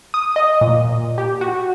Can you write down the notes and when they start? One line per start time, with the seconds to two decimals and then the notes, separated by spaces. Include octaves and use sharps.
0.14 D#6
0.36 D#5
0.61 A#2
1.18 G4
1.41 F#4